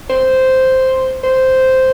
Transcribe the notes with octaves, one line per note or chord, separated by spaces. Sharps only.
C5
C5